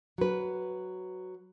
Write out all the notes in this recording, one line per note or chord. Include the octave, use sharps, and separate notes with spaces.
F#3 B4